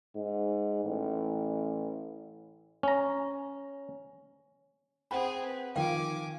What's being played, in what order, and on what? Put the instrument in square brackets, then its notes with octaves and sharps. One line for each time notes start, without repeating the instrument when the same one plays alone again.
[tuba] G#2
A1
[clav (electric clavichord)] C#4 A#5
[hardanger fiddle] C4 G#4 [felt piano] F#5 G5 [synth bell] B5
[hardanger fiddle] B4
[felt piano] D#3 F3 [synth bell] F5 G5 [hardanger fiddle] G#5 D6